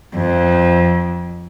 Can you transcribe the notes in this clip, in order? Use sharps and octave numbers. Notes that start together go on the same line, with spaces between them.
F2